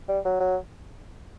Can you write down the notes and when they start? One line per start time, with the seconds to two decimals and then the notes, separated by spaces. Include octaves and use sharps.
0.08 G3
0.25 F#3
0.40 F#3